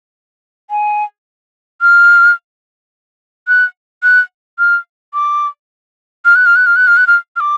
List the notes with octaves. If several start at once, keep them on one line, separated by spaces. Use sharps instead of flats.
G#5
F6
F#6
F#6
F6
D6
F6
F#6
F6
F#6
F6
F#6
F6
F#6
F6
F6
D6